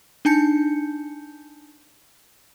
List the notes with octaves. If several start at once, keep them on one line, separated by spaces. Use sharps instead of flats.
D4 D#4 G#5 A5 G6 C#7